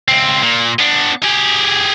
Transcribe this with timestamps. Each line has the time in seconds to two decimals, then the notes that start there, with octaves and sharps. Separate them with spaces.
0.08 C#2 C4
0.43 A#2
0.79 B3 D4
1.23 G4 G#4